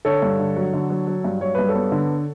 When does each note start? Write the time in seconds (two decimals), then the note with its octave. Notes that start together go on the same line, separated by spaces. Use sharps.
0.05 D3 A4 C#5
0.22 G2
0.39 D3
0.56 F#3
0.73 D3
0.90 F#3
1.07 F#3
1.24 G2
1.41 F#3 C#5
1.55 G2 B4
1.69 A4 C#5
1.75 B3
1.92 D3